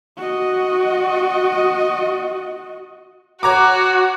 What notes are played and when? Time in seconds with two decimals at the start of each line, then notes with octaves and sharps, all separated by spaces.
0.17 F#4 D#5
3.43 F#4 C#5 A#5 D6